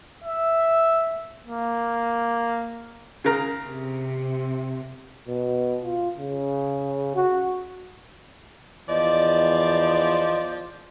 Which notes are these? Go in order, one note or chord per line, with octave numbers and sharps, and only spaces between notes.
E5
A#3
C#3 A#4
C3
B2
F4
C#3
F#4
E2 F3 D5 D#5